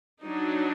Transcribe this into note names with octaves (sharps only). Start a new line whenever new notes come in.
F#3 D4 D#4